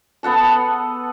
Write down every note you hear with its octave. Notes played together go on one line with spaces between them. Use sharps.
B3 A4 F#5 A5